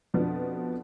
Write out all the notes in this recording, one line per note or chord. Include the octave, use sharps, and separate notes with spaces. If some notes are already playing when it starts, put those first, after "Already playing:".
F2 B2 F3 B3 D4